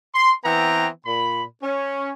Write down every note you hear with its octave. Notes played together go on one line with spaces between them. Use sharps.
C6
E3 B3 C4 G5 A#5
A#2 B5
C#4